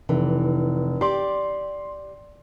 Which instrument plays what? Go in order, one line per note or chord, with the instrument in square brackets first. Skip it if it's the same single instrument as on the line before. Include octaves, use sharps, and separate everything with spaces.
[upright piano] F1 [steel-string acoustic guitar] E3
[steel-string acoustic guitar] G4 D5 [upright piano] C6